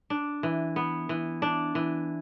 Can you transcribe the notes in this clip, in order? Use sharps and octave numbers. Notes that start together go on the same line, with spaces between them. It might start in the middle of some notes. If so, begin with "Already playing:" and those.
D4
E3
B3
E3
D4
E3